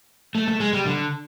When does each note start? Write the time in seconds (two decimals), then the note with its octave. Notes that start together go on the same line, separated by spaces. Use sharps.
0.35 A3
0.48 A3
0.60 G#3
0.74 G3
0.86 D3